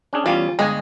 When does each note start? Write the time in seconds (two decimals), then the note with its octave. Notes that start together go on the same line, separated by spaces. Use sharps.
0.13 C#4 D4 G#4
0.26 E2 G3 C#4 F4
0.59 G1 G#3 D#5 G#5